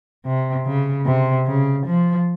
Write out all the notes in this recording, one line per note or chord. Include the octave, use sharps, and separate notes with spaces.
C3
C#3
C3
C#3
F3